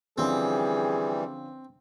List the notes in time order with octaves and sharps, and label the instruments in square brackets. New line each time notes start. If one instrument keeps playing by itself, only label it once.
[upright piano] D3 F3 C#4 [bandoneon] E3 G3 [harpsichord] C4 [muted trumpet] G#4